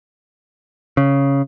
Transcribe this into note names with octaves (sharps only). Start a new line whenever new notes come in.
C#3